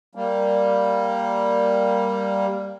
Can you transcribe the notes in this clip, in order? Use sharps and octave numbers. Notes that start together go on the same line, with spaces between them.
G3 A#3